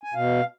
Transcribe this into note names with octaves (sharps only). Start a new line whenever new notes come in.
G#5
B2 F5